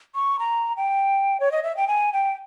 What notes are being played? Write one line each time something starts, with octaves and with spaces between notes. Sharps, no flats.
C#6
A#5
G5
C#5
D#5
E5
G5
G#5
G5